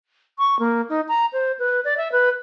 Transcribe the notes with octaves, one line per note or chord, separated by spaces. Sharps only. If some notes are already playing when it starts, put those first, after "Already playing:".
C#6
A#3
D#4
A#5
C5
B4
D5
E5
B4